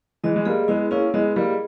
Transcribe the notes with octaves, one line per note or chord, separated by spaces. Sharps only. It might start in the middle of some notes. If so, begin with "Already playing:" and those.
E3 G#3 D#5
G#3
G3 A#3 G#4
G#3 B3 E4
A#3 C#4 E4
G#3 B3 D#5
G3 A#3 G#4